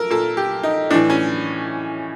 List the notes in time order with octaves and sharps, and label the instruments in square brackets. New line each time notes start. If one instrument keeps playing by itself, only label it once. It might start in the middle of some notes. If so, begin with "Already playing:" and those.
Already playing: [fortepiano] A4 A#4
A#2 A4
G4
D#4
A2 D4
E3
C#4